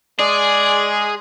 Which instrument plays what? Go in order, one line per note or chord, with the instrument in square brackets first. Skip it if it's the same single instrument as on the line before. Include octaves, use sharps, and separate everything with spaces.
[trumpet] G#3 [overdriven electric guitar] G#4 [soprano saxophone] D5